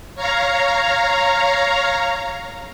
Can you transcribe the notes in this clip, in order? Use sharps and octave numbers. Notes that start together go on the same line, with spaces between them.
C#5 F5 A#5